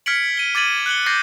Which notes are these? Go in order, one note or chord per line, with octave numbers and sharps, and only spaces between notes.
F6 G#6 B6 C#7 D7 F#7
D#7 G7
D6 G#6 A6 D#7 F#7
F#6 C#7 F#7 G7
D6 G6 A6 A#6 C7